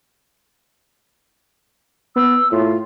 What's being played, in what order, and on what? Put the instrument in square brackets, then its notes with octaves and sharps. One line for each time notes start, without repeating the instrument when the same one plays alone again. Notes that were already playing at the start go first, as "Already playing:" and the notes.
[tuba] B3 [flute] E6
[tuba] A2 [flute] F4